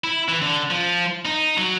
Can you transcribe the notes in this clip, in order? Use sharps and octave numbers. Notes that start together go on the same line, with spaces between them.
E4
E3
D3
F3
D#4
F#3